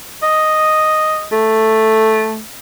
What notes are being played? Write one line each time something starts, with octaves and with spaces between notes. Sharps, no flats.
D#5
A3